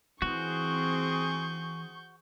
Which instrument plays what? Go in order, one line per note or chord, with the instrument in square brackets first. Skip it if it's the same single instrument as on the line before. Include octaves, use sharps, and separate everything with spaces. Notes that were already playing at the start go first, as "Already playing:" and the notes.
[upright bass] E3 [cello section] C4 G#4 [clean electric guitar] F#4 [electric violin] C#6 G6